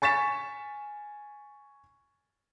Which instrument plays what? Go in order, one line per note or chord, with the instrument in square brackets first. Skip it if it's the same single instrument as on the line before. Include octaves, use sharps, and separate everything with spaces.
[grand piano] G#5 C#6 A6 B6 E7